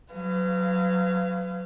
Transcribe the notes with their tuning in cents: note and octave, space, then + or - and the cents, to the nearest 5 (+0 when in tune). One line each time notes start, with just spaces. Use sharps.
F#3 -5 B4 +35 F5 -25